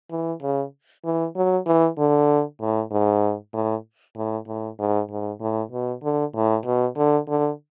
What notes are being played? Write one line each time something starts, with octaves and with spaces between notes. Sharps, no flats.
E3
C#3
E3
F#3
E3
D3
A2
G#2
A2
A2
A2
G#2
G#2
A2
B2
D3
A2
B2
D3
D3